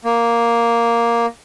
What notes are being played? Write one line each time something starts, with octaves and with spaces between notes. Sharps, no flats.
A#3